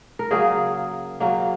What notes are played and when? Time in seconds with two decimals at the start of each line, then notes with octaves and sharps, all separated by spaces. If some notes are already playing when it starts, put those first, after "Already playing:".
0.19 A#4
0.31 C#3 F#3 A#3 G#4
1.20 C#3 F#3 A#3